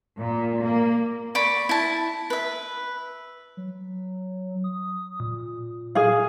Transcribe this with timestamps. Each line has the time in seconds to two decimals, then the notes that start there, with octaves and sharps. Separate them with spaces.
0.18 A#2
0.62 A#3
1.35 D5 B5 C#6
1.69 E4 A5
2.30 B4 E5
3.57 F#3
4.64 D#6
5.20 A#2
5.95 G#4 F5